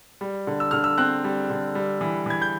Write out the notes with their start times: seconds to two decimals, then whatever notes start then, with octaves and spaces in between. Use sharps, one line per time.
0.21 G3
0.47 D3
0.60 E6
0.71 D3 F6
0.84 E6
0.98 C4 F#6
1.24 G3
1.50 D3
1.75 G3
2.01 E3
2.26 E3 G#6
2.42 G6